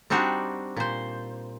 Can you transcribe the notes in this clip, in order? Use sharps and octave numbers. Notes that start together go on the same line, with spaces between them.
G3 C4 D4 D#4 F#4
A#2 C5